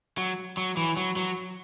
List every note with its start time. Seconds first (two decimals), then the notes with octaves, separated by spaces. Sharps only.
0.18 F#3
0.57 F#3
0.77 E3
0.97 F#3
1.16 F#3